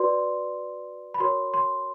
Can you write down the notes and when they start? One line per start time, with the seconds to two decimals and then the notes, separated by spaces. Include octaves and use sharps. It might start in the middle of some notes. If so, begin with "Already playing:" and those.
Already playing: F#4 B4 D5 C6
1.14 B5
1.20 F#4 A#4 C#5 C6
1.54 C6